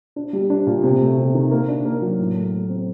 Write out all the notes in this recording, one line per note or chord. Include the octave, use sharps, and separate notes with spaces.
D4
G3
D4
A#2
C3
A3
C3
D#3
A#3
D4
A#3
F#3
A2
A3
A3
C4